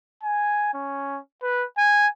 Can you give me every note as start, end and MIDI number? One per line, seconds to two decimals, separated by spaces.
0.23 0.74 80
0.74 1.18 61
1.42 1.64 71
1.78 2.07 80